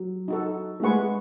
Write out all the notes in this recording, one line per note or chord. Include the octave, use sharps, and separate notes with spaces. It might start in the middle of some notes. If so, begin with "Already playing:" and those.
Already playing: F#3
D#4 F#4 A4
A3
G#3 G#4 B4 F#5 C#6